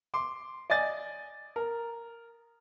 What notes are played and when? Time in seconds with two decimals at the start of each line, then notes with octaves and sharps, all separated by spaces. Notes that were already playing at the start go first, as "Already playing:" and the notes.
0.14 C6 D6
0.70 D5 D#5 G#5 A6
1.56 A#4